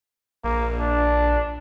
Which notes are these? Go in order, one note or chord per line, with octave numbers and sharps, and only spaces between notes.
A#1 A#3
D4